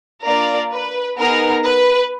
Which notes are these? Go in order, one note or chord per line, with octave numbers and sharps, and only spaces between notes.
A#3 D4 F4 A#4 D5
B4
B3 D#4 G#4 A#4
B4